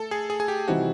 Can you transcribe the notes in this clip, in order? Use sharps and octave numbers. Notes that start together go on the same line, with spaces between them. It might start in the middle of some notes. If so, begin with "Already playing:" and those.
Already playing: A3 A4
G#4
G#4
G#4
G4
C3 E3 G3 C4 D#4 F#4